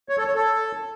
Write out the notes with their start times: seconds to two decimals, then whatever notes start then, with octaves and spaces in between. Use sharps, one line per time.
0.09 C#5
0.18 A4
0.26 C#5
0.35 A4